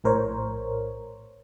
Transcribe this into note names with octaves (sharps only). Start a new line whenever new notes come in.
A#1 A2 A#4 C5 C#5